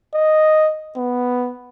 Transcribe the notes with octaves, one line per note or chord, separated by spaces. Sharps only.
D#5
B3